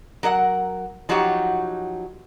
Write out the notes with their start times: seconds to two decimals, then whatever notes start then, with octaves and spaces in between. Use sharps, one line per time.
0.23 F#3 A#4 D#5 F#5
1.09 F3 F#3 D#4 F#4 G4 C#5